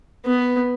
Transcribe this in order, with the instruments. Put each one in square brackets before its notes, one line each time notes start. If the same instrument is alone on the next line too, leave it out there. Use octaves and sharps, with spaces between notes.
[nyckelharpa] B3